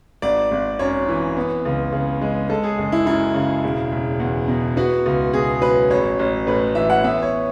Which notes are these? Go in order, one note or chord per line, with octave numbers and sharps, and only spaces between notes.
G#1 D5
G#1
F#2 C#5
E3
B3
C#2
C#3
G#3
G#3 A4
G#4
F#1
E4
F#2 E4
C#3
E1
E1
E2
B2
B3 F#4
C#2
B2 G#4
F#3 B4
A1 C#5
A1
A2 B4
E3 E5
F#5
B3 E5
C#5